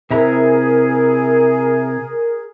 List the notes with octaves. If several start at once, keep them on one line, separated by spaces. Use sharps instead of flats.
C3 E4 G#4 A#4 A#5